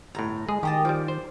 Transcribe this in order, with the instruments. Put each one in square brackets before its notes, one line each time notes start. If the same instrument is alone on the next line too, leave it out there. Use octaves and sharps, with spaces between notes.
[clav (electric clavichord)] G1 A2 [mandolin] A#5
[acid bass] G#3 [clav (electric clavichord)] G#4
[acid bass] D#3 [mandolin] G4 D#5 A5
[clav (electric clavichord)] F3 G3 [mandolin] D6
[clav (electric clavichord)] C5